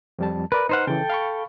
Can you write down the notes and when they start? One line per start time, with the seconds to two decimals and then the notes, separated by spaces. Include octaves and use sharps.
0.19 F2 G3 A5
0.52 A#4 B4 D5
0.69 D#4 B4 C5 F#5 F6
0.87 C#3 E3 A4 G5
1.10 F5 B5 C#6